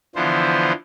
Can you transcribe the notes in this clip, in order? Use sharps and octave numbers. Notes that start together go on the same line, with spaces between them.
D3 E3 F3 B3 C5